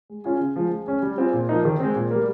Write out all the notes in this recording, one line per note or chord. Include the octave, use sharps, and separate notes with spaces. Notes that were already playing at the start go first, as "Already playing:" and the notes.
G#3
C#4 F4 G#4
C#3
F3 G#3
G#3
C#4 G#4
G3
C4 F4 G#4
A#2
F3 A#3 D#4
D#3
G#3 C4
A#2
G3 A#3